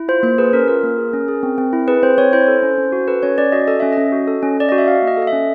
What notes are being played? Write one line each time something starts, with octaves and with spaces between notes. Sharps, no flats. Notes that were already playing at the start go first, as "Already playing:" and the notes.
Already playing: E4
F4 C5
A#3 C5
G#4 B4
C#4 A#4
F4 A#4
A#3
G#4
C#4
G#4
C4
C4
E4
G#4 B4
C4 C5
C4 C#5
E4 C5
A4
C#4
C#4
F#4
A4 B4
C#4 C#5
C#4 D5
F#4 D#5
A4 D#5
C#4 E5
C#4 D#5
F#4
A4
C#4
C#4 D5
F#4 D#5
E5
F#4 F5
A#3
D#5
A4
D#5
E5
C#4